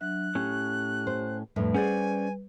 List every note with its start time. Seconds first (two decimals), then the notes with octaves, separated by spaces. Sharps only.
0.01 F#3 D4 E5 F#6
0.35 A2 C#4 G4
1.07 C5
1.56 F2 A2 G3 D4 B4
1.74 C#4 G#4 C5 D5 F#5 G#5